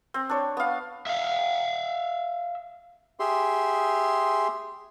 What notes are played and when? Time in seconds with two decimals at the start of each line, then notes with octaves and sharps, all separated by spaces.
0.14 C4
0.29 D4 C#5
0.57 B3 F5
1.07 E5 F5
3.20 G4 G#4 E5 C6